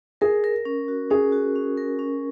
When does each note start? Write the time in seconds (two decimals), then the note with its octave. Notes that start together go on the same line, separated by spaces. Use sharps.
0.21 G#4 A#4
0.44 A#4
0.65 C#4
0.88 F#4
1.11 C#4 G#4
1.32 F#4
1.56 C#4
1.78 A#4
1.99 C#4